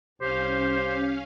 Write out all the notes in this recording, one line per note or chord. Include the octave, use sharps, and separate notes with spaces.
C2 C#4 G4 C5 F5